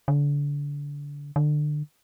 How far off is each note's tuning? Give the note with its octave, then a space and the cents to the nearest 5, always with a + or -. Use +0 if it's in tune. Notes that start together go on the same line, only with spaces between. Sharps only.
D3 -30
D3 +25